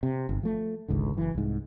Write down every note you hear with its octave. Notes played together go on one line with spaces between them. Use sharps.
C3
G1
F3 A3
G#1 C#2 G#2 D3
F#1 E3
C2 G#2